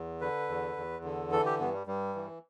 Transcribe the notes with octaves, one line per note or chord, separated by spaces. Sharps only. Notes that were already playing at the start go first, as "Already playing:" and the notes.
Already playing: E2
D3 B4
E2
E2
D3
E3 A4
G4
G2 B3
G3
G2 G3
E3